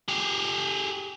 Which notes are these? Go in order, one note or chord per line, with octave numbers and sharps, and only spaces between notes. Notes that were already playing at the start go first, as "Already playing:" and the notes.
G4 G#4